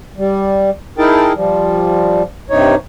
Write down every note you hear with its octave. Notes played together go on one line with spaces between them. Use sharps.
G3
D#4 E4 G#4 A#4 G5 A5
F3 G3
G2 C3 D#4 C#5